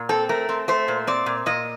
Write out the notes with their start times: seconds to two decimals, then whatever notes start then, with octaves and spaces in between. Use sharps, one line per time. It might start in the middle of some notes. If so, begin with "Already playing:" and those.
Already playing: A#2
0.09 C4 A4
0.29 A3 A#4
0.49 C4
0.68 A3 C5
0.88 A#2
1.07 C4 D5
1.26 A#2
1.46 A#2 D#5